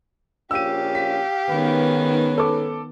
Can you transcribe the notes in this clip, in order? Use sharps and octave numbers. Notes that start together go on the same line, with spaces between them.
A#1 C#4 F4 G4 F5 E6 D#7
B6
G#2 D#3 B3 C#4 B4
A4 D6